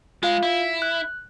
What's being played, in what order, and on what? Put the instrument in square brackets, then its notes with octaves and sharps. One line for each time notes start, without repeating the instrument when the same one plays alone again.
[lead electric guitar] G#3 [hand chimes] F4 F5
[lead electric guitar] E4
[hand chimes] F#6